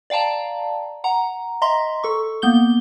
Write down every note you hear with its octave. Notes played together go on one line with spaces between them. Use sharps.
D5 F5 G5 A5 A#5
F#5 A#5
D#5 E5 A#5 C6 B6
A4 C#6
A#3 B3 G6 G7